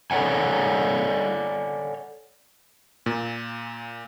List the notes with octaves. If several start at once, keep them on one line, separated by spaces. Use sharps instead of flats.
A4 B4 C#5 D5 F#5 G#5
A#2